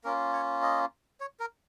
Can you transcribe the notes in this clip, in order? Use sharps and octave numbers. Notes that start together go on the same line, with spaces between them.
A#3 C#4 F4 A#4
C#5
D#5
C#5
A#4